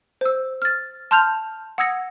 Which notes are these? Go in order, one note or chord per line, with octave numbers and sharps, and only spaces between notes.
C5 E6
F6 A6
A5 C6 F6 G6 F7
F#5 D#6 E6 G#6 A#6 C#7